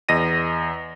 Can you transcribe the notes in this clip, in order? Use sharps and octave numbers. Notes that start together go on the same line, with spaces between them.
E2 D#5 A#6 D#7